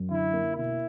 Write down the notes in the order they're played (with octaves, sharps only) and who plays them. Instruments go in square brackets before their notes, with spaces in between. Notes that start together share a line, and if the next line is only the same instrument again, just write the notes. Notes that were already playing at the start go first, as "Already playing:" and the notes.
Already playing: [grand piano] F#2
[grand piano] D3 [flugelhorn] E4
[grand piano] A#3
[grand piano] B2 [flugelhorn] E4